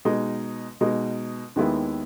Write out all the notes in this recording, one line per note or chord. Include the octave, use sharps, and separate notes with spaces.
B2 G#3 D#4
B2 G#3 D#4
D#2 D#3 G#3 B3 E4